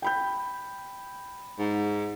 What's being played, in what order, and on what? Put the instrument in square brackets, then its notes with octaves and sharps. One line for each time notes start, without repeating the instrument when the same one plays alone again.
[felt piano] G5 B5 G6
[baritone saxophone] G#2